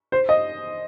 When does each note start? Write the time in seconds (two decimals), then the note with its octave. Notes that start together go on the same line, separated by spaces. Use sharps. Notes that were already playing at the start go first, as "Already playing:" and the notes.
0.12 C5
0.29 D#5